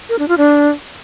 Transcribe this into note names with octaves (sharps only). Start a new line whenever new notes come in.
A#4
D4
F4
D4